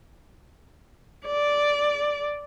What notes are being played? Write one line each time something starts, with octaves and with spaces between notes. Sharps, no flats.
D5